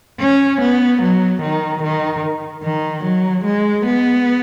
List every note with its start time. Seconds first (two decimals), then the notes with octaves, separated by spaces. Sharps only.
0.20 C#4
0.61 B3
1.02 F#3
1.42 D#3
1.83 D#3
2.63 D#3
3.04 F#3
3.44 G#3
3.86 B3